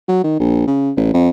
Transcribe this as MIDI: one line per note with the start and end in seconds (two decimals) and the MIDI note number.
0.08 0.20 54
0.24 0.39 51
0.40 0.64 34
0.67 0.92 49
0.97 1.11 33
1.14 1.29 41